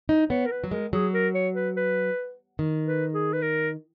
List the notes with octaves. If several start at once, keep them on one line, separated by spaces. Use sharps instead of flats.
D#4
B3 C#5
A#4
B4
F#3
G#3 A#4
F#3 G#4
A#4
C#5
B4
B4
D#3
B4
G#4
B4
A#4